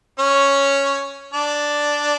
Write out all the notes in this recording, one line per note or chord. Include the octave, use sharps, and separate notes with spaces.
C#4 C#5
D4 D5